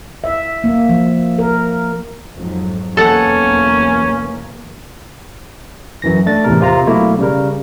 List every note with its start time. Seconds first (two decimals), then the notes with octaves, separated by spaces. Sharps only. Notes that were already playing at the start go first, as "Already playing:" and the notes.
0.24 E5
0.64 A#3
0.89 F3
1.39 A#4
2.35 F2 G#2 F#3
2.97 B1 E2 A#3 C#4 A4 F#5
6.02 F#2 E3 A#6
6.26 A3 D4 A6
6.44 E2 A2 C3 A#4
6.60 C3 F4 A#5
6.87 B2 F#3 A3 A#3 E4
7.19 C#3 G3 A#4